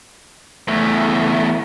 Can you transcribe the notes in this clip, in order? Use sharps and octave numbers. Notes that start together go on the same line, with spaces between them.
E2 A3